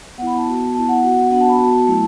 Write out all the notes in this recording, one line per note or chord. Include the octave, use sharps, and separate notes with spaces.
B3 E4 F#5 B5
A5
B3 F#4
B3 E4 A5
F#5
B3 F#4
B3 D4 F#4 F#5
A5
B5
B3 F#4 A5
F#3 A3 E4